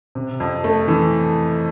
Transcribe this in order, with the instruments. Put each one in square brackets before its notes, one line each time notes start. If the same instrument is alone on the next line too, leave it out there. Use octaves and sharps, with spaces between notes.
[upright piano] C3
F2
A3
E3